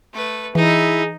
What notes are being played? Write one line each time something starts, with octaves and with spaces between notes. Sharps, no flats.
A3 B4
E3 D#4 E4 G#4